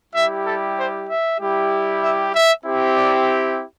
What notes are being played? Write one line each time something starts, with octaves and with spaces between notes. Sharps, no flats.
G3 E4 G4 E5
A4
C5
E5
G3 E4 G4
E5
E5
C4 E4 G4
D5